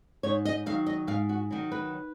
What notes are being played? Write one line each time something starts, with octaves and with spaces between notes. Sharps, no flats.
G#2 C#5
D#5
D#3 F#3 F5
D#5
G#2 F5
F#4
D#3 F#3
B4